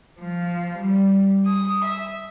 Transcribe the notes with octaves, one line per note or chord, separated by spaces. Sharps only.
F3
G3
D#6
E5